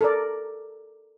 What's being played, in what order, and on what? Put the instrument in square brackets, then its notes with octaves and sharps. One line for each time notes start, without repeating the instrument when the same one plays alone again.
[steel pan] A4 A#4 D5